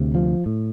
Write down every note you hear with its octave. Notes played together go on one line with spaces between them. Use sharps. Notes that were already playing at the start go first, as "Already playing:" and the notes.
Already playing: D2 C3
F3
A2